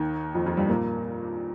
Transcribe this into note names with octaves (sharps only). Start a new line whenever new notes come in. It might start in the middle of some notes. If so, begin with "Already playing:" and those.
Already playing: D#2 D#3
F2 F3
F2 F3
G2 G3
A#2 A#3